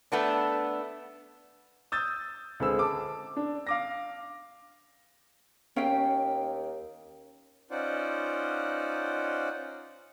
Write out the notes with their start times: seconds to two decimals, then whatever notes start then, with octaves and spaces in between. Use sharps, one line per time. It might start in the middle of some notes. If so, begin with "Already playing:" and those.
0.12 A3 B3 D4
1.92 D#6 E6 G6 A6
2.60 C#2 D3 C4 G#4 B5 E6
2.79 A5 D6
3.37 D4
3.67 F5 D6 A#6
5.76 D#2 C#4 F5 G5
7.71 C#4 D#4 F4 C5 D5 F#5